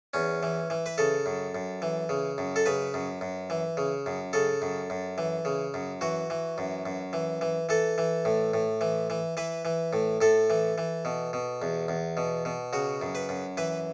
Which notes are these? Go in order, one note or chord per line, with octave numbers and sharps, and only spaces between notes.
E2 C#4
E3
E3
B4
C#3 A4
F#2
F#2
E3
C#3
F#2
A4
C#3 B4
F#2
F#2
E3
C#3
F#2
C#3 A4
F#2
F#2
E3
C#3
F#2
E3 F#4
E3
F#2
F#2
E3
E3
E3 A4
E3
A2
A2
E3
E3
E3 B4
E3
A2
A2 A4
E3
E3
B2
B2
E2
E2
B2
B2
C#3 F#4
F#2
B4
F#2
E3 B4